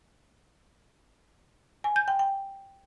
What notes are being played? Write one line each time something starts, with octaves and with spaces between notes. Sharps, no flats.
G#5
G6
G5
G5